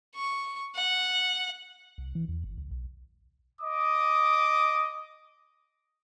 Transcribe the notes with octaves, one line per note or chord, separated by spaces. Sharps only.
C#6
F#5
C2
E3
E2
G1
C#2
B1
D#5 D6 D#6